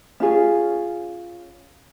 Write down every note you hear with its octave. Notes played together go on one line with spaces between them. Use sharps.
C#4 F4 G#4